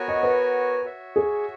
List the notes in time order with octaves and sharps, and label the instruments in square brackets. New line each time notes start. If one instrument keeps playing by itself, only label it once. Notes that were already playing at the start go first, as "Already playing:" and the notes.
Already playing: [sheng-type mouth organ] B3 F#4 A#4 C#5 G#5
[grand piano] D#5
B4
[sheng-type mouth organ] F#4 C#5 E5
[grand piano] G#4